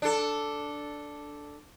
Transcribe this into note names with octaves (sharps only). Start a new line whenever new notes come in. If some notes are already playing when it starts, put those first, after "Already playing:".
D4 A4